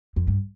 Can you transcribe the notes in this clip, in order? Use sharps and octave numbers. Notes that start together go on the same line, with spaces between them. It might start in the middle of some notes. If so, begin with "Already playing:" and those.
F2
G2